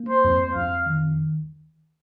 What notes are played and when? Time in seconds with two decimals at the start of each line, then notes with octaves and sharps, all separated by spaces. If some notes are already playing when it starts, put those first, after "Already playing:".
Already playing: A#3
0.09 C5
0.25 F2
0.55 F2 F5
0.86 D#3